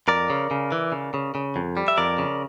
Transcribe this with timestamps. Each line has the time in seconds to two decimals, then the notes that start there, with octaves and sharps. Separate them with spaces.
0.08 F2 A#4 D5
0.30 C#3
0.51 C#3
0.72 E3
0.92 C#3
1.14 C#3
1.35 C#3
1.56 F2
1.77 G3
1.88 E5
1.97 F2 A#4 D5
2.18 C#3